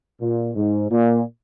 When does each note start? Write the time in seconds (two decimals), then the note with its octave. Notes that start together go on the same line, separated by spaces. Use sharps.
0.20 A#2
0.55 G#2
0.89 A#2